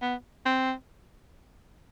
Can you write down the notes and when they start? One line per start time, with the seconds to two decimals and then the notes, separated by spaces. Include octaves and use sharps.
0.02 B3
0.45 C4